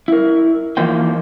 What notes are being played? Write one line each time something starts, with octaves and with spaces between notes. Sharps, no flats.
E4 A#4
E3 F3 A#3 D#4 C5 G5